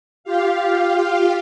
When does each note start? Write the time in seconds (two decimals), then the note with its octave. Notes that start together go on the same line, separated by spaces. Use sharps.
0.24 F4 G4 F5